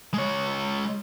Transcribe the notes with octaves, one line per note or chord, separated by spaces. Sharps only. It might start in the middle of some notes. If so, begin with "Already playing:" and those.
G#3 C#5